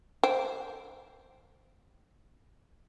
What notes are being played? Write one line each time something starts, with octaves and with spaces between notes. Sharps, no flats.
C5 G5